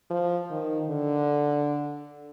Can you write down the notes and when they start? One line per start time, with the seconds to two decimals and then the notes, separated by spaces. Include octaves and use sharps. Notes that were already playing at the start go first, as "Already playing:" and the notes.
0.10 F3
0.51 D#3
0.90 D3